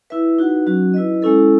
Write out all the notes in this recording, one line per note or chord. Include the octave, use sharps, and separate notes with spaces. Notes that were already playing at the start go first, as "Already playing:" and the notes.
E4 B4 E5
D#4 F#4 B4 F#5
F#3 C#4 F#4
E4 B4 D#5
G#3 C#4 E4 A4